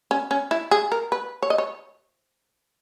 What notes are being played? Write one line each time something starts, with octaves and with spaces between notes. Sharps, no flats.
C#4
C#4
E4
G#4
A#4
B4
C#5
D#5
C#5